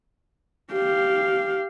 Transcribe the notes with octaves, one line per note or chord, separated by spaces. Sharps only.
G4 F5